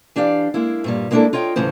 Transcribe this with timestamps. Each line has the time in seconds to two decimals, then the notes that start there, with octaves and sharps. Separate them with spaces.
0.16 E3 D4 G4 D5 F5
0.54 G#3 A#3 E4
0.84 G2 A#2 G3
1.11 G#3 A#3 B3 D4 E4 A4
1.33 F4 C#5 D#5 G5
1.56 D2 A2 C#3 E3 C5